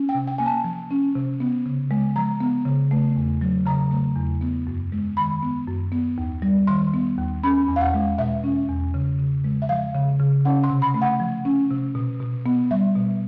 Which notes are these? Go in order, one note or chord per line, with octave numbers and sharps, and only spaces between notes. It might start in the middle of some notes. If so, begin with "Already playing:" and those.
Already playing: C#4
G5
C3
G5
A#3 G#5
A5
F3
C#4
C3
B3
C#3
G#3
F3 A#5
B3
C#3
A3
E2
F#3
C#3 A#5
A3
E2
B3
F#2
G#3
D#3 B5
B3
F#2
B3
D#2
G3
D#3 C6
B3
D#2
C#4 B5
E2
F5
F#5
G#3
B2 E5
C#4
E2
C#3
C#3
G#3
E5
F3 F5
C#3
C#3
C#4 F#5
C6
C3
B5
A3
F#5
F3
C#4
C3
B2
B2
B3
G3 E5
B2